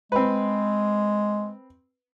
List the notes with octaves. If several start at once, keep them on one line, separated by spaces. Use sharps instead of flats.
G#3 C4 B4